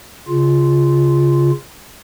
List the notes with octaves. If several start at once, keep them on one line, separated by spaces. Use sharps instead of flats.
C#3 F4